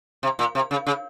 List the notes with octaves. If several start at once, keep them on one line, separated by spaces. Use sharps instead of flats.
C3
A#2
C3
C#3
C#3